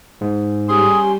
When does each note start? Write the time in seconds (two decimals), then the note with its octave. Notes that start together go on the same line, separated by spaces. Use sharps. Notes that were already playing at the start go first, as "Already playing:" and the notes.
0.21 G#2
0.69 G3 C#4 G4 G#4 C6